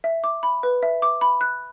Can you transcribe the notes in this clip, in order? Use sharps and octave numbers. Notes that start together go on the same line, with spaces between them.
E5
D6
B5
B4
E5
D6
B5
F#6